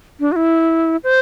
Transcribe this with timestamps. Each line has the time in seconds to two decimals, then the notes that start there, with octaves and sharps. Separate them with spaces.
0.20 D4
0.32 F#4
0.36 E4
1.04 C5